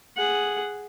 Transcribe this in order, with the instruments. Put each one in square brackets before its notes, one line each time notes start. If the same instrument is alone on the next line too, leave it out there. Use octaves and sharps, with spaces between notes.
[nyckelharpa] G#4 F#5